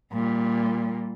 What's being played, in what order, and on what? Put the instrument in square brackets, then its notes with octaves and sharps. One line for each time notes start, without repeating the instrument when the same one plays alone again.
[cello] A#2 G3